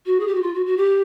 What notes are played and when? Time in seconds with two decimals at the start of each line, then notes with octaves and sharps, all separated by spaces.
0.06 F#4
0.20 G#4
0.27 G4
0.35 F#4
0.42 F4
0.54 F#4
0.66 F#4
0.77 G4